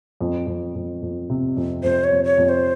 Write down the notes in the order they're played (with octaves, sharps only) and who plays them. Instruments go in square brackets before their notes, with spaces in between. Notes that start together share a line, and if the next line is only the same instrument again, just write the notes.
[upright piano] F2
F2
F2
F2
C3
F2
[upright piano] F2 [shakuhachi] C5
[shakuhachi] C#5
[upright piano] F2
[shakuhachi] C#5
[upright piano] F2
[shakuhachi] C#5
C5